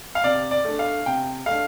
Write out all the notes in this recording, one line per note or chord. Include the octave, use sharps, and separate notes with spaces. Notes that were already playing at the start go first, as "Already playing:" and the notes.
F5
C3 D5
D5
A3 D4
F5
C3 G5
A3 F5
D4